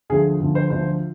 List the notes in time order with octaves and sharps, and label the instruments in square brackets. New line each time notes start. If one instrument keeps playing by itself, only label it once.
[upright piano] D2 D3 F3 G#4
D2 D3 F3
C5
D2 D3 F3 C5